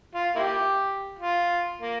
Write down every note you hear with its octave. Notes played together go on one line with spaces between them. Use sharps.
F4
A#3 E4 G4
F4
A#3